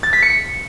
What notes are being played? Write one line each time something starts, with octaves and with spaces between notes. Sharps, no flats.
A6
B6
C#7